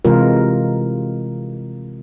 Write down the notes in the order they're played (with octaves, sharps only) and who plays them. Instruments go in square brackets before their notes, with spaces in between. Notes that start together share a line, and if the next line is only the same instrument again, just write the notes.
[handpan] C3 E3 G#3 F4 A#4